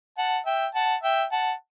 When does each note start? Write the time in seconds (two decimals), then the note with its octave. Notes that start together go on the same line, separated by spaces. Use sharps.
0.18 F#5 A5
0.46 E5 G5
0.75 F#5 A5
1.03 E5 G5
1.32 F#5 A5